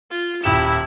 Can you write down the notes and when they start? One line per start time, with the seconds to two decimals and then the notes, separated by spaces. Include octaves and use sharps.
0.11 F4
0.44 D#1 E4 G4 E7